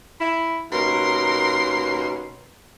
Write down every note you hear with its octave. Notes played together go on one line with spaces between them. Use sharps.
E4
D#2 B2 C#4 A#4 C6